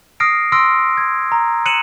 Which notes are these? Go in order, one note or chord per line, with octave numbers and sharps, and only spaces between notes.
D#6 F6 A#6 C7 D7
C6 E6 F6 A#6 D7
G#6
A#5
F#6 C#7 D#7 E7 F#7